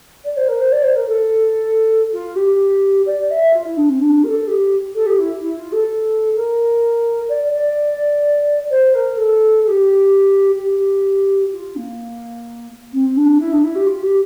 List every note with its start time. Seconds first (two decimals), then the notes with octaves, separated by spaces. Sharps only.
0.24 D5
0.36 C5
0.48 A#4
0.59 C5
0.72 D5
0.83 C5
0.95 A#4
1.06 A4
2.12 F4
2.35 G4
3.06 D5
3.30 E5
3.53 F4
3.65 E4
3.77 D4
3.89 C4
4.01 D4
4.23 A#4
4.27 A4
4.47 G4
4.94 A4
5.06 G4
5.18 E4
5.41 E4
5.57 F4
5.72 A4
6.35 A#4
7.29 D5
7.52 D5
8.70 C5
8.94 A#4
9.17 A4
9.64 A4
9.67 G4
10.58 G4
11.52 F4
11.76 A#3
12.92 C4
13.16 D4
13.39 E4
13.52 D4
13.63 E4
13.75 G4
13.86 F4
14.02 G4